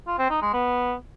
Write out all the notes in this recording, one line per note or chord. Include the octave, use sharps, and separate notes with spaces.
F4
C4
D#4
G#3
B3